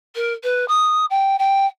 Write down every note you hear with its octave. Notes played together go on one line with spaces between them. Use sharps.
A#4
B4
D#6
G5
G5